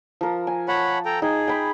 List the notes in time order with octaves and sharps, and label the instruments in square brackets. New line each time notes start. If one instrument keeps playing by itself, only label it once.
[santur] F3 A#4
G#5
[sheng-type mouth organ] C#5 F#5 B5 [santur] A5
[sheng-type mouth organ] A4 G5 A#5
[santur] D#4 G5 [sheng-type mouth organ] G#4
[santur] G5 B5